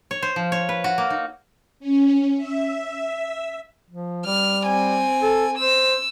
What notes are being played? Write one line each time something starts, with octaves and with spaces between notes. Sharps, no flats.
C#5
C5
F3
C#5
B4
F#4
A#3
D#4
C#4
E5
F3
G3 F6
C4 G#5
A4
C5 E6